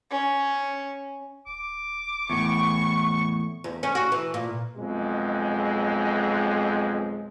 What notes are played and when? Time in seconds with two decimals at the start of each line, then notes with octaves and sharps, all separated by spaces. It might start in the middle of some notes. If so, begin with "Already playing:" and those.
0.11 C#4
1.47 D#1 D6
2.30 E2 A2 C#6
3.64 E2
3.83 C#4
3.95 F#4
4.12 E3
4.34 A#2
4.76 B1 F2 G#3